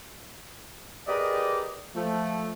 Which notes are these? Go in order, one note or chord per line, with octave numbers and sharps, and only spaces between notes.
G4 G#4 A#4 B4 D5 D#5
F3 A3